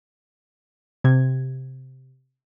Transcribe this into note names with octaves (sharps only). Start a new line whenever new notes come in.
C3 G#6